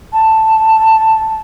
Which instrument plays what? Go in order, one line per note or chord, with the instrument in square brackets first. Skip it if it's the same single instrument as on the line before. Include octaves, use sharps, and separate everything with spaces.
[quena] A5